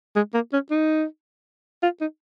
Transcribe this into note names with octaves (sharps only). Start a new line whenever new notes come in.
G#3
A#3
C#4
D#4
F4
D#4